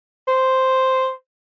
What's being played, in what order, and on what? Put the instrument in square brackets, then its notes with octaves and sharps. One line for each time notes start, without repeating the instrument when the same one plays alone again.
[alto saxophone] C5